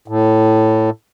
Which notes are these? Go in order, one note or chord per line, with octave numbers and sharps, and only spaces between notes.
A2